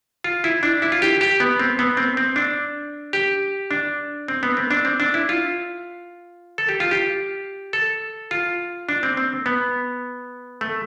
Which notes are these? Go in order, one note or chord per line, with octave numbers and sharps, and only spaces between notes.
F4
E4
D4
E4
F4
G4
G4
B3
C4
B3
C4
C4
D4
G4
D4
C4
B3
C4
D4
C4
D4
E4
F4
A4
G4
F4
G4
A4
F4
D4
C4
C4
B3
A3